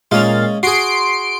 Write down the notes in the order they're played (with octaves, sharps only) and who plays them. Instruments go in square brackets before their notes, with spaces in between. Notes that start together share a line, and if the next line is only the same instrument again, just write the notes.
[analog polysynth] A#2 F5 A6 [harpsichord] G#3 C#4
[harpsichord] F#4 G#4 [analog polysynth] C6 C7 D7